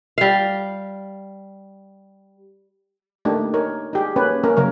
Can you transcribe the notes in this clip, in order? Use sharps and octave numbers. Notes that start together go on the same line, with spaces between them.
G3 F5
A3 A#3 D4 D#4 G4
D#4 A#4 C#5
D#4 G4 G#4
A#3 C#4 B4 C#5
A#3 C#4 A#4
C#3 F#3 A#4 C#5